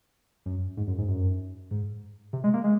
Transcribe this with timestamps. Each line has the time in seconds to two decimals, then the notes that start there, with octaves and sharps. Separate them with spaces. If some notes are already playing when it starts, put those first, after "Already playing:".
0.46 F#2
0.77 G#2
0.87 F#2
0.98 G#2
1.08 F#2
1.71 G#2
2.33 C3
2.44 G#3
2.54 A#3
2.64 G#3